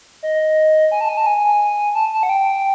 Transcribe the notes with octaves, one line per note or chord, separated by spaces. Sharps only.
D#5
G#5
A5
G#5
A5
G#5
A5
A5
F#5
G5